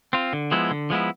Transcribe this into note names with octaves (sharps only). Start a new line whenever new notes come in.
C4 F4
D3
F3 G#3 B3 E4
D3
F3 G#3 B3 E4